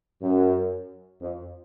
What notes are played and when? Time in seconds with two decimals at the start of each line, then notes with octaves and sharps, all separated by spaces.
0.22 F#2
1.21 F2